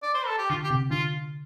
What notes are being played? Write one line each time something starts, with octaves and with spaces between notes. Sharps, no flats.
D5
C5
A4
G4
D3 F4
G4
C3
D3 F4